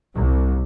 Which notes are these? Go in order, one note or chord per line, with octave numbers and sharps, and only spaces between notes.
C2